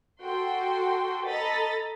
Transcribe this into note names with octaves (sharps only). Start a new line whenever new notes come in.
F#4 A4 G5 C6
A4 D#5 A#5 B5 A6 B6